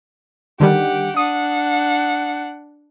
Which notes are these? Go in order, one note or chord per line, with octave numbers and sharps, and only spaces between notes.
D3 D#3 G3 G4 F#5
D4 F#5 D#6